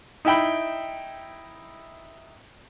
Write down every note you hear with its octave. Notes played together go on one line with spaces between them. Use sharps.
D#4 E4 E5 G5 B5